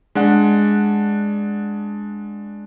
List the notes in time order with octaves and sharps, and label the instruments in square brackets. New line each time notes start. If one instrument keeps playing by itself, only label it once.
[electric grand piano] G#3 D4 F#5